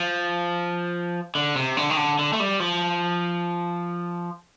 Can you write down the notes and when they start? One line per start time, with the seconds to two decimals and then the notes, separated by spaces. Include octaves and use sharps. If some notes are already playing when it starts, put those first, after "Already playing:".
Already playing: F3
1.35 D3
1.56 C3
1.77 D3
1.90 D#3
1.97 D3
2.19 D3
2.33 A3
2.40 G3
2.60 F3